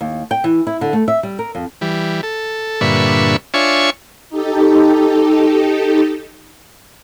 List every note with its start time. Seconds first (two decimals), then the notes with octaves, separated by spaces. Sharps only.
0.01 D#2
0.31 G5
0.44 E3
0.67 E4
0.81 D3
0.93 A3
1.08 E5
1.23 G3
1.39 A#4
1.55 F2
1.81 E3 G3
2.23 A4
2.81 G2 A#2 D3 B4 E5 C#6
3.54 D4 F4 C#5 E5 G#5 C#6
4.30 D#4 G4 A4